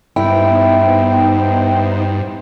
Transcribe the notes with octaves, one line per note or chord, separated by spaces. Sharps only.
G2 B3 D#4 E4 C5 G5